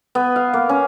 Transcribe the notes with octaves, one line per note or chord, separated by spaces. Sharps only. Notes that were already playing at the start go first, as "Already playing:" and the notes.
B3
F5
A#3
C#4